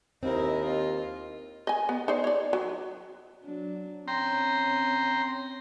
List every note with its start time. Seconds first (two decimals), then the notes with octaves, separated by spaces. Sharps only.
0.23 D#2 C4 E4 A#4 D#5
0.64 F4
1.67 D#5 G#5
1.89 B3
2.08 D#4 C5 D5
2.24 C#5 D5
2.53 F#3
3.43 F#3 D4
4.08 C4 C#4 C#5 G5 A#5 C6